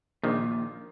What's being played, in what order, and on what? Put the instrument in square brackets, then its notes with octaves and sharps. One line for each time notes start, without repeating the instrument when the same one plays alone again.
[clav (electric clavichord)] A#1 D#3 [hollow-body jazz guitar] A#2